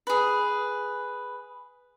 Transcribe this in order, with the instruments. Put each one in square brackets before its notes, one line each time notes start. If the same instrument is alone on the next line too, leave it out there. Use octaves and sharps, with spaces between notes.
[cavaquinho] G#4 B4